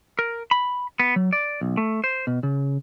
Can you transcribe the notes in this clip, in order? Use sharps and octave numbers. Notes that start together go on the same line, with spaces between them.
A#4
B5
B3
F#3
D5
B1
A3
C5
B2
C#3